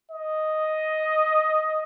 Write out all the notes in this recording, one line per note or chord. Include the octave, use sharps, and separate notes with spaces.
D#5